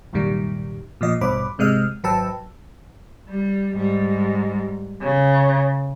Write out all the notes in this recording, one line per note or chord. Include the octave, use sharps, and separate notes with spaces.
C2 F#2 A#2 D#3 G3
A#2 F3 D#5
A1 G2 B2 C5 B5 D6
G#1 C3 G#3 D#5 F6
G#1 F#3 B4 G5 A5 E6
G3
G#2 G3
C#3